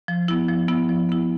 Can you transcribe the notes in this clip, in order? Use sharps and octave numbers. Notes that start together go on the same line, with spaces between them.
F3
B3 E4
F3
B3 E4
F3
B3 E4